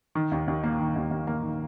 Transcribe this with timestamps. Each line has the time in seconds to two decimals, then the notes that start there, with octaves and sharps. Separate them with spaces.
0.15 D#3
0.32 D#2
0.48 D#2
0.64 A#3
0.80 D#3
0.96 D#2
1.11 D#2
1.27 A#3
1.43 D#3